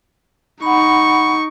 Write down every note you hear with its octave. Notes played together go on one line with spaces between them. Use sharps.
D#4 F#5 B5 C#6